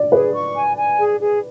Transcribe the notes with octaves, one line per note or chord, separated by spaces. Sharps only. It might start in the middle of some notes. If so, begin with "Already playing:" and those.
Already playing: D5
G#4 B4
C#6
G#5
G#5
G#4
G#4